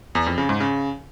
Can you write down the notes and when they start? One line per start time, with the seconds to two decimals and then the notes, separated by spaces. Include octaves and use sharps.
0.15 E2
0.26 F2
0.38 C#3
0.49 G#2
0.60 C#3